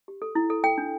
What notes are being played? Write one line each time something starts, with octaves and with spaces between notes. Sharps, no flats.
G4
A4
E4
A4
A4 G5
D4